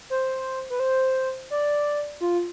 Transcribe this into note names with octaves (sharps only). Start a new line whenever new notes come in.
C5
B4
C5
D5
F4